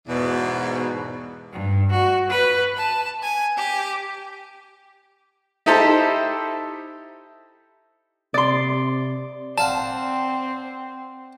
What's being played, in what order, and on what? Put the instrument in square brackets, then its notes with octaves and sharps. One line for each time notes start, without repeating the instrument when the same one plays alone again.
[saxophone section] E2 G#2 B2
[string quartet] G2
F#4
B4
A5
G#5
G4
[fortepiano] D#4 E4 G4 A4 C5
[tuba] C3 [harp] D5 C6
[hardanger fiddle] C4 [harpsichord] D5 F5 F#5 [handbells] A5